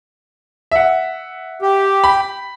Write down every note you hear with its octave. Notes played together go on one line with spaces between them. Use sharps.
E5 F#5
G4
B5